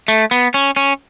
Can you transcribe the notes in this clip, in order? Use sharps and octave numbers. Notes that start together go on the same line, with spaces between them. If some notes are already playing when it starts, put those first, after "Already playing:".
A3
B3
C#4
C#4